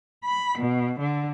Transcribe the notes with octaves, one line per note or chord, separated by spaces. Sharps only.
B5
B2
D3